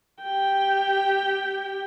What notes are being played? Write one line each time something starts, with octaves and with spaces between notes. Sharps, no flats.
G4 G5